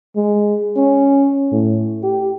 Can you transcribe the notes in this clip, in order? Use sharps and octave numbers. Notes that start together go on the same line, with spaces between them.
G#3
C#4
A2
G4